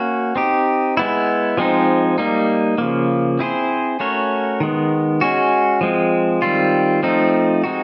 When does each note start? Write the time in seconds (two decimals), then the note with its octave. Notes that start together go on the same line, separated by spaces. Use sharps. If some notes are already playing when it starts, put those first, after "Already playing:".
Already playing: A#3 C#4 F#4
0.36 C4 D#4 G4
0.97 G#3 B3 E4
1.57 F3 G#3 C4 D#4
2.18 G3 A#3 D#4
2.78 C#3 F3 A#3
3.39 C4 E4 G#4 C5
4.00 A3 C#4 F#4 A#4 C#5
4.60 D#3 G#3 B3
5.21 G#3 C#4 F#4
5.81 F3 G#3 C4
6.42 D#3 G3 C4 F4
7.03 F3 A3 C4 D#4
7.64 G#3 C4 D#4 F#4